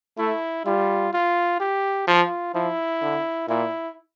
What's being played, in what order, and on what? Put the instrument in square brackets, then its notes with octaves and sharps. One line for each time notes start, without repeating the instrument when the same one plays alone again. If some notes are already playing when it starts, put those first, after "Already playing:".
[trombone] A3 [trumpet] E4
[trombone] G3 [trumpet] F4
[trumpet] F4
G4
[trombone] F3 [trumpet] F4
[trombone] F3 [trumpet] E4
[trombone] D3
[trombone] A#2 [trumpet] E4